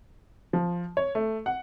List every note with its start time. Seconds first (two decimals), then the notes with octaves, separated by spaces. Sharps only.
0.53 F3
0.97 C#5
1.15 A3
1.46 F#5